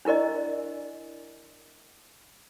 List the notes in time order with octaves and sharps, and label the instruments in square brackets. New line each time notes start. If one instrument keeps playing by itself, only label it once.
[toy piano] D4 E4 A#4 D5 D#5